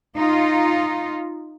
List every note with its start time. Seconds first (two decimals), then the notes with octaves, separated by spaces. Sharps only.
0.16 D#4 F4